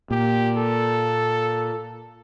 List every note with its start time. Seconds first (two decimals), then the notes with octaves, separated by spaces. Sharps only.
0.11 A#2 G4
0.57 A4